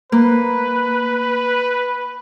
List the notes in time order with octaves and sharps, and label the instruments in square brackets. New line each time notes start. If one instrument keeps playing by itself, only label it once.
[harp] A#3 [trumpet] B4